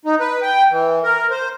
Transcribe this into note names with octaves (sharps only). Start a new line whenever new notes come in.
D#4
B4
G5
E3
A#4
C5